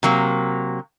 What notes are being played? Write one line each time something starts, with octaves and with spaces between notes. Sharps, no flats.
C3 F#3 A#3